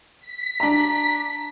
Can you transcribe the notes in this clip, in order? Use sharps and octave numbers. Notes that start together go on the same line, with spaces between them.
B6
D4 A#5